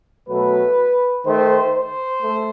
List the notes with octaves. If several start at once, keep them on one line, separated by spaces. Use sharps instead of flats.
B2 F#3 A3 B4
D#3 A3 C5
C5
A3